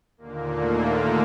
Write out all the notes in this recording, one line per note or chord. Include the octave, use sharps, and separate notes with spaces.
D#2 A#2 D3 A#3
A3
A3